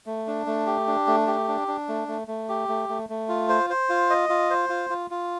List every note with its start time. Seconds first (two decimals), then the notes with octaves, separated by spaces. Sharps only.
0.06 A3
0.27 D4
0.47 A3
0.66 G4
0.87 D4
1.07 A3
1.27 G4
1.48 D4
1.68 D4
1.88 A3
2.08 A3
2.28 A3
2.49 G4
2.68 A3
2.89 A3
3.09 A3
3.29 F4
3.49 C5
3.70 C5
3.90 F4
4.10 D#5
4.29 F4
4.50 C5
4.69 F4
4.90 F4
5.11 F4